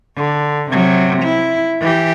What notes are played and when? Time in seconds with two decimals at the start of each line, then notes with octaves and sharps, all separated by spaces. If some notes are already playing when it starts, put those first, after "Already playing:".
0.16 D3
0.70 C3 F#3
1.22 E4
1.80 E3 G4